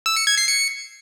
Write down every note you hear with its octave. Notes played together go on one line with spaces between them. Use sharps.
E6
C#7
G#6
C7
C#7